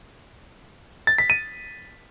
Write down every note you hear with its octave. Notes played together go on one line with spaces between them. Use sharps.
A6
B6
D#7